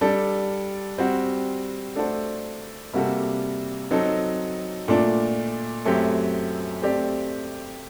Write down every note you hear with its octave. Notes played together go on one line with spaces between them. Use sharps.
G3 D4 A4
G3 C4 F#4
A3 D4 F#4 A4 C5
C3 G3 A#3 F#4 A4
F#3 C4 D#4 A4
A#2 A3 D4
F#2 F#3 A3 C4 G4
A3 C4 G4 D5